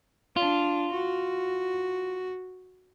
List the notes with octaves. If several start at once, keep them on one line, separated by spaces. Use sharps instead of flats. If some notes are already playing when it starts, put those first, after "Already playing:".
D4 F4
F#4